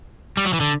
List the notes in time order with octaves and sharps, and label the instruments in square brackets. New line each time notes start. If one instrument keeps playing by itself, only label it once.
[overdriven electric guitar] G3
F#3
E3
D3